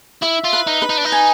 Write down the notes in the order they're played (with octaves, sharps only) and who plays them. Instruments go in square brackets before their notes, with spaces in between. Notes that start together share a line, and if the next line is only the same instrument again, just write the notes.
[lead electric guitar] E4 [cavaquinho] E5
[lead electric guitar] F4
[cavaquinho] B4
[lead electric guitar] D#4
[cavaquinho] B4
[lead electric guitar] D#4
D4
D#4
[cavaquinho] G#5